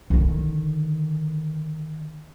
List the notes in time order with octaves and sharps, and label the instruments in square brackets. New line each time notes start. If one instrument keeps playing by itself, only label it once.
[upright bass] D3 D#3